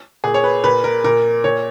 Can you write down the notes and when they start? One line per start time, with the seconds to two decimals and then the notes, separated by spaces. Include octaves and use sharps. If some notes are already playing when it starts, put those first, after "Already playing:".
0.24 A#2 G#4
0.34 C#5
0.44 B4
0.64 A#2 B4
0.84 A#4
1.04 A#2 A#4
1.44 A#2 C#5